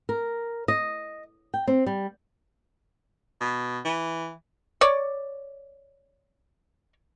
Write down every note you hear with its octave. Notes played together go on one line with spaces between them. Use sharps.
A#4
D#5
G5
C4
G3
B2
E3
C#5 D5